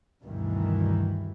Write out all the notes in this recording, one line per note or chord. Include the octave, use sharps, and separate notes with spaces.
D2 G2 B2 D#3 E3